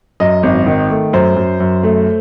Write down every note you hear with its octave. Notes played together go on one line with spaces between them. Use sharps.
F#2 D#5
G#1
D#3
A3
F#2 C5
F#2
F#2
A3